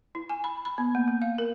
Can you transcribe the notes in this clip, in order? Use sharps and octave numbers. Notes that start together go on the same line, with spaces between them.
E4
G#5
B5
B5
B3
A#3
A#3
F5
A#4